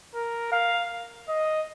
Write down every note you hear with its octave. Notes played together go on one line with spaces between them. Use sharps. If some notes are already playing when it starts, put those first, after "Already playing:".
A#4
F5
D#5